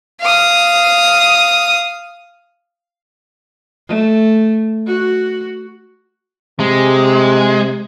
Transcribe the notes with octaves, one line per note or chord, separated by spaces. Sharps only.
F5 D#6
A3
F#4
C3 G#3